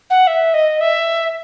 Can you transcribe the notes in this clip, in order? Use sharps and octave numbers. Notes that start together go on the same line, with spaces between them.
F#5
E5
D#5
E5